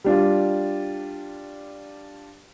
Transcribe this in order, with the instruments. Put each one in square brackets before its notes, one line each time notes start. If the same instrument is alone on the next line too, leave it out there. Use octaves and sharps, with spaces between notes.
[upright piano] G3 D4 F4